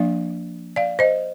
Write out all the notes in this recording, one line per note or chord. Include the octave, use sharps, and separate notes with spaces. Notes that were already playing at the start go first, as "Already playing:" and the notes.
Already playing: F3 A#3 D4 D5 F5
D5 F5
C5 D#5